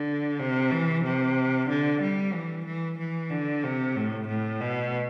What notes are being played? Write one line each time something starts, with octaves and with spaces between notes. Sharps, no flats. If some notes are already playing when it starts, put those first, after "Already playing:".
Already playing: D3
C3
E3
C3
D3
G3
E3
E3
E3
D3
C3
A2
A2
B2